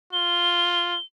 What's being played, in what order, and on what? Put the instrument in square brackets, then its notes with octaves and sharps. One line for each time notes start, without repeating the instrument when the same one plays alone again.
[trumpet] F4 [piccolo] G7